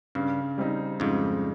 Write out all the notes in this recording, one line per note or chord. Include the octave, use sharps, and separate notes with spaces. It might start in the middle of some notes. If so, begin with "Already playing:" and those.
G2 C#3
G3 C4 D#4
F2 G#2 C#3